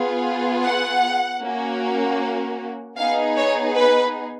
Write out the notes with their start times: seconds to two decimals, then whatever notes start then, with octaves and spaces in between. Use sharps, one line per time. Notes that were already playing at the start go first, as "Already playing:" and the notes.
Already playing: B3 F4 G#4
0.63 F#5
1.41 A#3 C#4 F#4
2.97 B3 D#4 G#4 F5
3.37 C#5
3.76 B4